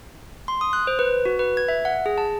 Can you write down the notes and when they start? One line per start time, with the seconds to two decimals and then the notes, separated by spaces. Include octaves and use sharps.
0.48 C6
0.61 D#6
0.73 F#6
0.87 C5
0.99 B4
1.25 F#4
1.39 B4
1.57 G#6
1.68 E5
1.85 F#5
2.06 G#4
2.18 A5